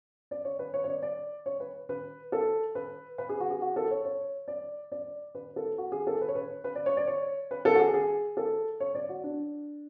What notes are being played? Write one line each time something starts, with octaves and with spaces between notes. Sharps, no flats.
D5
C#5
B4
C#5
C#5
D5
D5
C#5
B4
B4
A4
B4
B4
G#4
F#4
G#4
F#4
A4
C#5
C#5
D5
D5
B4
A4
F#4
G#4
A4
B4
C#5
B4
B4
D5
C#5
D5
C#5
B4
A4
F#4
G#4
G#4
A4
C#5
D5
F#4
D4